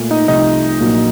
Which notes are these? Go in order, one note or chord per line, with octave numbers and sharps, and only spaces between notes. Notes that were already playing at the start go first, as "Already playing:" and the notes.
Already playing: A#2 A3
D#4 D#5
C2 C3 F3 A3 C4 D#4 D#5
A#1 A#2 F#3 A#3